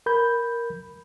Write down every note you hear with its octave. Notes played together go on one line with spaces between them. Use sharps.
A#4 B5 G6